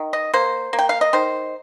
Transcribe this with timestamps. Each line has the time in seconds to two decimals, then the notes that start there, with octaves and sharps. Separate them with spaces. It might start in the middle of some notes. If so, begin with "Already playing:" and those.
Already playing: D#3
0.13 D#5
0.34 A#3 C5
0.73 A#3
0.79 G5
0.89 F5
1.01 D#5
1.13 D#3 C5